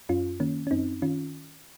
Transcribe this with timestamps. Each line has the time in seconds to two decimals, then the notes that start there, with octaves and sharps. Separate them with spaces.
0.09 F#2 C#4 F4
0.40 D#3 A#3 C#4
0.67 C#4
0.71 F#2 C4 D#4
1.02 D#3 C#4 F4